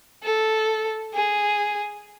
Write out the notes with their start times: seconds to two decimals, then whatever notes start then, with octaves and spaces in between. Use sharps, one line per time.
0.23 A4
1.14 G#4